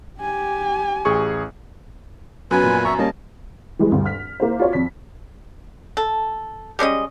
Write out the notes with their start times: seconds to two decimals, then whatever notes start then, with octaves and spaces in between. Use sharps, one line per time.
0.20 G4 G#5
1.05 A1 G#4 C#6
2.51 F#2 F#3 B3 B4 G#5
2.64 A#2
2.85 E5 A#5 C#6
2.99 G3 A#3 C#4 D#5 A5
3.79 E3 G3 G#3
3.92 D2 G2
4.06 F6 B6
4.40 A#3 E4 C5
4.59 F4 F#4 C#5 D5
4.73 F2 B6
5.97 A4
6.79 G3 G#3 C#4 D#5